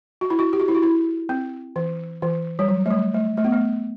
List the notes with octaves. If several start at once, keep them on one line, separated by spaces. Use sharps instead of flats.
F#4
E4
F#4
G4
F#4
E4
F#4
E4
C4
E3
E3
G3
F#3
A3
G3
A3
A3
B3
A3